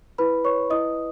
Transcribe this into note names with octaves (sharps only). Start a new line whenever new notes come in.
E4 B4 B5
B4 C#5 C#6
E4 D#5 D#6